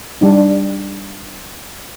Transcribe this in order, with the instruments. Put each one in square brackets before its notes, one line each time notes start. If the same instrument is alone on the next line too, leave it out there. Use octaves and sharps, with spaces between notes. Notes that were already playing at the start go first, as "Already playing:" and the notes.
[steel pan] G3 D4 D#4